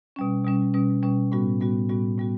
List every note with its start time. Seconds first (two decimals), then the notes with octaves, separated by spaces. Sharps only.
0.16 B2 G3 C#4
0.45 B2 G3 C#4
0.74 B2 G3 C#4
1.03 B2 G3 C#4
1.32 A2 G3 B3 F#4
1.61 A2 G3 B3 F#4
1.89 A2 G3 B3 F#4
2.18 A2 G3 B3 F#4